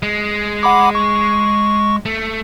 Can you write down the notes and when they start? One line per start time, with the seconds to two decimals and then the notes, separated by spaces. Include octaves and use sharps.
0.03 G#3
0.63 F#5 B5 D6
0.95 C#6
2.05 A3